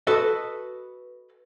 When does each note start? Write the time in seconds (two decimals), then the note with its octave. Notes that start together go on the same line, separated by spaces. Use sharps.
0.07 F#4 A4 B4 D#5